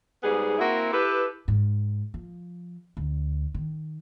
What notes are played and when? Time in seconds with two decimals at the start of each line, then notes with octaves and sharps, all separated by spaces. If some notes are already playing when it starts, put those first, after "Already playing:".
0.24 G#2 G3 B3 G#4
0.59 A#3 C4 E4 F#4
0.93 E4 G4 A4 B4
1.48 G#2
2.14 F3
2.97 D2
3.54 D#3